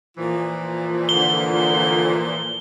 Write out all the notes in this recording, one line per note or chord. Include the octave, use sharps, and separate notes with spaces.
A#2 E3 F3
D3 G7